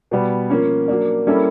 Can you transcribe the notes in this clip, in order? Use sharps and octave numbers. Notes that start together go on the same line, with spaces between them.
B2 G3 B3
F3 A#3 C#4
F#3 A#3 D4
G3 A#3 C#4 E4 A4